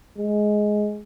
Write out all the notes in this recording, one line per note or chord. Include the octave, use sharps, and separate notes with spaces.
G#3